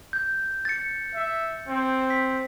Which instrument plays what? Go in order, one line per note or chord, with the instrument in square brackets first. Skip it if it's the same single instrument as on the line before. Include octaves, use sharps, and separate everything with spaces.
[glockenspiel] G6
A6 C#7
[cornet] E5
C4
[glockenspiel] B6